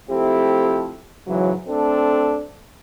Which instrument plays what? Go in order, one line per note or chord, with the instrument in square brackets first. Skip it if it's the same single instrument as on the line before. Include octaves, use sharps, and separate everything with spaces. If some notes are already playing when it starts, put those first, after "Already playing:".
[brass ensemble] F3 A3 C4 E4 G4 A4
G#2 C#3 E3 F#3
A3 C4 D4 A4